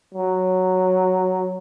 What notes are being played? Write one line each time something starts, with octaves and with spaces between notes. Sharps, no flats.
F#3